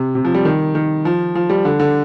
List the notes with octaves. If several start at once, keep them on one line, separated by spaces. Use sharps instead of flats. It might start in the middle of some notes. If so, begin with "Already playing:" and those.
Already playing: C3
C3
F3
G3
D#3
D#3
F3
F3
G3
D3
D3